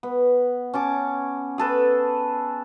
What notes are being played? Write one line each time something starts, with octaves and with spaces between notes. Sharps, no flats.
B3
C#4 A5 D6
G#4 A4 B4